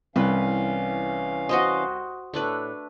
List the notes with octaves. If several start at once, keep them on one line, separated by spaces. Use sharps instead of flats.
C2 E3 C#4 B4 F5
F#4 C5 D#5
A2 A3 D4 B4